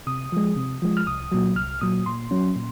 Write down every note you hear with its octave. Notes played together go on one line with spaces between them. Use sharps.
C3 D#6
F3 G#3
C3
F3 G#3
F6
C2 D#6
A#2 F#3
C2 F6
A#2 F#3 D#6
A#2 C6
F#3 C#4
A#2